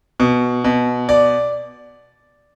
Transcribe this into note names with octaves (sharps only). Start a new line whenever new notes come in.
B2
B2
D5